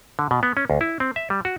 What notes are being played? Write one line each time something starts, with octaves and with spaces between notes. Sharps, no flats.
D3
B2
B3
C#4
D2
E4
C4
E5
G3
F#4